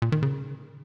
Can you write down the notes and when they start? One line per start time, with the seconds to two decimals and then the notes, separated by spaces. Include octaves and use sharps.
0.02 A#2
0.12 D#3
0.23 C#3